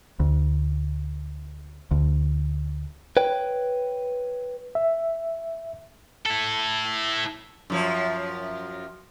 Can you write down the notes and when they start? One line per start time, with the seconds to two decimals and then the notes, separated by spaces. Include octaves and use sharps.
0.20 D2
1.91 D2
3.17 B4 C#5 G5
4.75 E5
6.26 E4 A4
7.70 F#2 F3 C#5